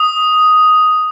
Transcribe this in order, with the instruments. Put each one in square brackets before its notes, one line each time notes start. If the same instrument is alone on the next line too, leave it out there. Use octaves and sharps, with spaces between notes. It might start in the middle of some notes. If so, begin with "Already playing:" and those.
Already playing: [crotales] D#6